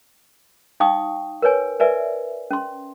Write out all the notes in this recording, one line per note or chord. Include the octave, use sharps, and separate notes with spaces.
D#4 F5 G5 C#6 D#6
A#4 B4 C#5 G#5
A#4 B4 D5 E5 G#5
C#4 C6